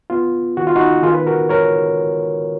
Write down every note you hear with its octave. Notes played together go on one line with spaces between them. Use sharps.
B3 F4
D#3 F#4
F4
D#4 F#4
D#3 F4 G#4
B4
F#4 A#4
G#3 A#4 C#5